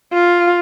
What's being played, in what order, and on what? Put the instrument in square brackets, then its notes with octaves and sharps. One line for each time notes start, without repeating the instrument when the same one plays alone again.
[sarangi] F4